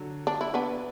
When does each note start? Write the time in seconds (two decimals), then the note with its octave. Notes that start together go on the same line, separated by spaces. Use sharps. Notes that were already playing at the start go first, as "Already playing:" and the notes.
Already playing: D3 F#3
0.27 D4
0.41 E4
0.54 B3 D4